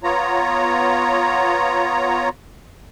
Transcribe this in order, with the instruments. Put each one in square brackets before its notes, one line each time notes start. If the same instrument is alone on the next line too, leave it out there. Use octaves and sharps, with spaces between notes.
[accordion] B3 F4 C#5 A#5